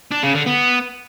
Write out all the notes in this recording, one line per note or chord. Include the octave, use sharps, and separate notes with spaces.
D4
C#3
D3
B3